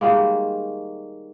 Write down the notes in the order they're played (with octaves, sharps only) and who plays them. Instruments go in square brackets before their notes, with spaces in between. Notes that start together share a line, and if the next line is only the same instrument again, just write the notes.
[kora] D#3 G3 G#3 A#3